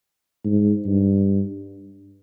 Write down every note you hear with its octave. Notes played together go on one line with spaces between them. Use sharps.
G#2
G2